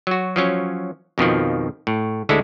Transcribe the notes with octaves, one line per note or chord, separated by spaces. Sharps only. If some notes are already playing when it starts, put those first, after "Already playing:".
F#3 F#4
F3 F#3 C#4
F2 B2 D#3 F3
A2
D2 D3 G#3 E4 A4